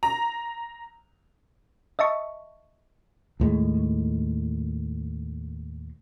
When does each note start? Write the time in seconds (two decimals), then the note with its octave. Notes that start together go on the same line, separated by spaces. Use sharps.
0.03 A#5
1.99 D#5 E5 A5 C#6
3.40 D#2 A2 G#3